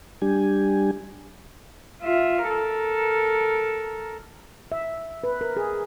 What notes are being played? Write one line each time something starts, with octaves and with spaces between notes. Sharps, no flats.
G3 D4 G4 G#5
F4 E5
A4 A#4
E5
B4
A#4
G#4